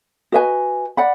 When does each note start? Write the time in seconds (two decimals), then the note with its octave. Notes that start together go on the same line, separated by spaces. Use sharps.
0.32 F#4 B4 D#5 G#5
0.97 D5 F#5 B5